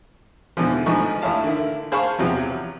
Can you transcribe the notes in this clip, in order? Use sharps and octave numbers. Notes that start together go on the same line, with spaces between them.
E2 G#2 B2 D3 E3 F3
A1 G#2 D3 F3 D#4 C#6
A1 E4 C#5 F5 A5
D3 D#3 E4
G#4 C5 F5 A5 B5 C#6
E2 C3 F3 F#3